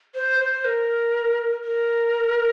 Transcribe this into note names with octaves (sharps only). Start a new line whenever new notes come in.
C5
C5
A#4
A#4